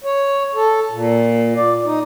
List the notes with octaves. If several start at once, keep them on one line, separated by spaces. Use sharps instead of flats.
C#5
A4
A#2
D5
D#4